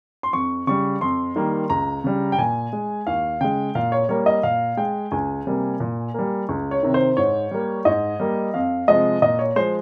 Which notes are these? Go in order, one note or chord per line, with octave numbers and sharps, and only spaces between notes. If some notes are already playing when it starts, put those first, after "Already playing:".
C6
F2 C#6
C#3 G3 C#6
F2 C6
D#3 G3 A#3
C#2 A#5
C#3 G3
G5
A#2 G#5
G#3
D#2 F5
C#3 G#3 G5
A#2 F5
C#5
G3 A#3 C#5
D#5
A#2 F5
G#3 G5
C#2 G#5
C3 G3 A#3
A#2
G3 A#3
C#2
C#5
C3 D#3
C5
G#2 C#5
G3 A#3
G#2 D#5
G3 A#3
F2 F5
C3 F3 G#3 D#5
A#2 D#5
C#5
F3 G#3 C5